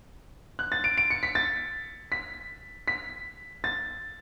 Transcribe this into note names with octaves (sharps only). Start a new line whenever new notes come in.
F#6
A6
D7
D7
C#7
B6
A6
B6
B6
A6